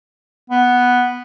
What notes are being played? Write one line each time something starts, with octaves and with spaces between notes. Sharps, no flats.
B3